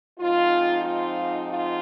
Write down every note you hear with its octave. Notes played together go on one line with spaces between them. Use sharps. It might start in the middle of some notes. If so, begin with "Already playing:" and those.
G#2 F3 C4 D#4 F4
F4
F4